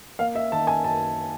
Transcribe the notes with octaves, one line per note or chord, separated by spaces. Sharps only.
A#3 F5
E5
D#3 A5
G#5
F#2 A5